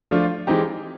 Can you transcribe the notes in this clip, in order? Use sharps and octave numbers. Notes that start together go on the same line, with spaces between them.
F3 A3 D4 F4
E3 G#3 C4 D#4 G4